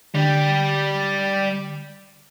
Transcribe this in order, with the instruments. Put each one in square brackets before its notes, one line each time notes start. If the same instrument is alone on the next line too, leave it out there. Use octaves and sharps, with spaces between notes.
[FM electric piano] D3 [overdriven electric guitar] G3 G4